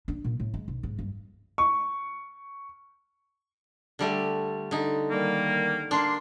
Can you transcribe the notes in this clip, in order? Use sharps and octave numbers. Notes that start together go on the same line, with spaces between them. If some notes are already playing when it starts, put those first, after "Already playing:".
D4
A#2
A2
G#3
B1
G#2
G2
C#6
D3 G3 A3
D3 D#4
D#3 G3 A#3
A#3 D4 C6